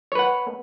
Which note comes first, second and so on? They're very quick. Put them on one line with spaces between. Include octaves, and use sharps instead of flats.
C#5 B4 F#5